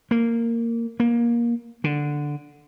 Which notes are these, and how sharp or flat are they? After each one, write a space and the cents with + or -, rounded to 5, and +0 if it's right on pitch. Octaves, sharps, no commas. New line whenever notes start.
A#3 -10
A#3 +20
D3 +0